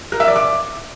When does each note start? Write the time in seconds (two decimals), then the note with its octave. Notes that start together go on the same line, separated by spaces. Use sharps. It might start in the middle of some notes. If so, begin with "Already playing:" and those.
0.12 A#4
0.20 E5
0.28 D5
0.36 D6